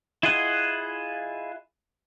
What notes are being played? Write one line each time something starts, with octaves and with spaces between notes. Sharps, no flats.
E4 F4 G#4 D#5 F#5